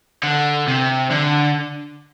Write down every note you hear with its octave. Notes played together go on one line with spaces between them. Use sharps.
D3
C3
D3